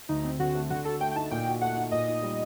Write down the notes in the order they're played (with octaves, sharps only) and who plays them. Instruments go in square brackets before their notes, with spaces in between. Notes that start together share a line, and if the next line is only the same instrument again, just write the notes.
[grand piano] D2 [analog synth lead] D#4
[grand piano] C4
[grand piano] D3 [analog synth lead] F#4
[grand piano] A3
[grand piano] D3 [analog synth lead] F#4
[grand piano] F#4 [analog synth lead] A4
[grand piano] A3 [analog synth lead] G5
[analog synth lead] G5
[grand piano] D#4 [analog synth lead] A5
[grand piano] A#2 [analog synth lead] G5
[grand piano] F#4
[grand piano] A3 [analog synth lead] F#5
[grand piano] D#4
[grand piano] A#2 [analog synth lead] D#5
[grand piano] D#4
G3